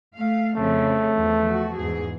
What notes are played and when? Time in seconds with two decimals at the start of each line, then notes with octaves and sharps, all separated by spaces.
0.13 A3 F5
0.57 F2 C#3 A3 C4
1.15 E2 F3
1.48 F#4
1.77 E2 G#2 G#4